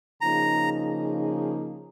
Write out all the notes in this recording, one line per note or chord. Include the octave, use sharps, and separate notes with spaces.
C#3 F3 A#3 D#4 G#4 A#5